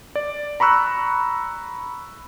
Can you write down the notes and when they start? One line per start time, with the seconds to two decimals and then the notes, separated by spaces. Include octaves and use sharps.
0.15 D5
0.60 A#5 B5 C#6 E6 F#6